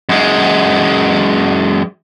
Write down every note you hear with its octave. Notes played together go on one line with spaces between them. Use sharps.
F#2 G#3